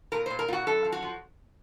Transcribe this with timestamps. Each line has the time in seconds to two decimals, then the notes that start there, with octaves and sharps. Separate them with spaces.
0.12 A#2 A#4
0.26 C5
0.30 A#2
0.39 A#4
0.48 A#2 F4
0.53 F#4
0.67 F#2 A4
0.85 F3
0.92 F#4
1.02 F3